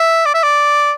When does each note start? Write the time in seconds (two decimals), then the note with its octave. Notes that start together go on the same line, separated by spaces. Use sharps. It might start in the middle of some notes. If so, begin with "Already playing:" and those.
Already playing: E5
0.26 D5
0.34 E5
0.43 D5